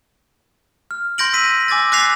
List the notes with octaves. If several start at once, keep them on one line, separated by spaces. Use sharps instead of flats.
F6
C6 G6 A#6 D7 F#7
E6 A#6 B6 D#7
G#5 D6 E6 A6 A#6
D6 F#6 A6 B6 C7 F7